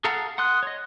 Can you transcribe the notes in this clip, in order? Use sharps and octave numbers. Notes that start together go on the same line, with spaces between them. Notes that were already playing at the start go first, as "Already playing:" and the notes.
G#4 A4 F5 F#5 A#5
F#5 C6 D#6 F#6
C#5 D#5